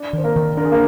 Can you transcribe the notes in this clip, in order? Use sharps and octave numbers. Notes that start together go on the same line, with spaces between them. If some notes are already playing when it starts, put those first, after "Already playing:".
Already playing: D4 D5
D#3 C5
A#3 A#4
D#3
D4 A#4
G#4
A#3 A#4